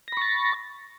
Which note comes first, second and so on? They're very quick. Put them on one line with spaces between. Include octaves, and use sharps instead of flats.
A#6 B5 C#6 A6